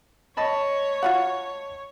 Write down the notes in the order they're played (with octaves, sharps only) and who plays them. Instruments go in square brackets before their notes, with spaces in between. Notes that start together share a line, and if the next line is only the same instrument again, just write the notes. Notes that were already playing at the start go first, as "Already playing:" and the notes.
[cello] C#5 [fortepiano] D#5 A5 B5
[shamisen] F4 F#4 F#5